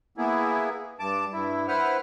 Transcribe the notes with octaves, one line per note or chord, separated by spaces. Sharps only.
A#3 B3 E4 G#4
G2 A5 D6
G2 E4
E4 B4 C5 F#5 F6